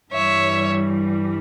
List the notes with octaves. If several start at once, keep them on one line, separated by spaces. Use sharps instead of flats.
G2 E3 G3 C#5 E5